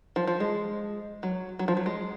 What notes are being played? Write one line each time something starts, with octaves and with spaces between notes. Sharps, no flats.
F3
F3
G#3
F#3
F#3
F3
F#3
G#3